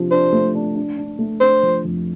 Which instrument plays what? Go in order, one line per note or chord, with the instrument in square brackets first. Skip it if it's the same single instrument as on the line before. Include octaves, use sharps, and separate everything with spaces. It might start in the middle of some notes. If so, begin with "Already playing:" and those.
Already playing: [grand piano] C3 F3 D4
[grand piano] D4 [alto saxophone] C5
[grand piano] A3
D4
D4
D4
A3
[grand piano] D4 [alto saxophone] C5
[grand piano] F3
F2